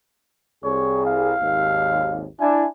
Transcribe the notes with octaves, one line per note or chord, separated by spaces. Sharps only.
C2 G#4 C#5
F5
G#1 D#2
D4 E4 G#5